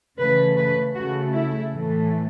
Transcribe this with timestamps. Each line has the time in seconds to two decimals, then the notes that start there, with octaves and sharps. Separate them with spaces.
0.19 C#3 E3 A3 B4
0.57 B4
0.95 C#3 A3 F#4
1.33 E4
1.71 A2 E3 A3